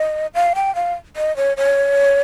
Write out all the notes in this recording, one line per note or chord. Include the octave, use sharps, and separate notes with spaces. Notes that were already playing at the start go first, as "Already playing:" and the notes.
Already playing: D#5
F5
G5
F5
D#5
C#5
C#5